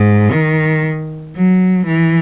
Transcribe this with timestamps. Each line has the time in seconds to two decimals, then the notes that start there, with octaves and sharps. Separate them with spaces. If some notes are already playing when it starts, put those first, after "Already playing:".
Already playing: G#2
0.32 D#3
1.34 F#3
1.86 E3